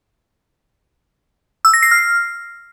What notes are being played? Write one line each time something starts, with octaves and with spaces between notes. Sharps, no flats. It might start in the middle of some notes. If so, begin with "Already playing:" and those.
E6
A#6
C7
F6